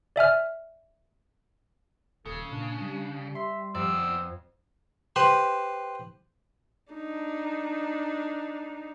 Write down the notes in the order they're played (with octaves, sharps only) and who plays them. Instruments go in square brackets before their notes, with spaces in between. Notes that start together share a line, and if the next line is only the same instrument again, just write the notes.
[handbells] D5 E5 G#5 F6
[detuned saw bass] D#1 [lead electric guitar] C#3 [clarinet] A4
[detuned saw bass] A#2 [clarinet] D4
[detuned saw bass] G3
[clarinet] E5 [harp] C6
[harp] F2 [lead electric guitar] B3 D5 [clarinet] E6
[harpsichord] G4 B4 C5
[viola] D4 D#4